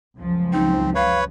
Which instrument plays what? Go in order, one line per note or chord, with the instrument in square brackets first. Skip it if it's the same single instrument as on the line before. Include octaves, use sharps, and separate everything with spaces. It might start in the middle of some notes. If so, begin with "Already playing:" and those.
[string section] C#2 F#2 F3
[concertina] C4 [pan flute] D#4
[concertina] B4 C#5 [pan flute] F5